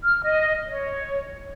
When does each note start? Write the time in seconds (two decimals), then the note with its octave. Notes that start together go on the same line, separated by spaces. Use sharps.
0.04 F6
0.23 D#5
0.67 C#5